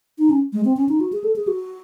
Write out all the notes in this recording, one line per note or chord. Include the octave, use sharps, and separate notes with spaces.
D#4
C#4
G#3
C4
C#4
D#4
F#4
G#4
A4
G#4
F#4